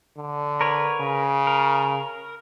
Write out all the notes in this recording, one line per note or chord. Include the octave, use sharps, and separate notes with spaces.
D3
A#4 B4 C#5
C#3
A#4